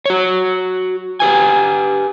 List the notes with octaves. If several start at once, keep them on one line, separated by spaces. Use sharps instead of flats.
F#4 C#5
G4 B4 G#5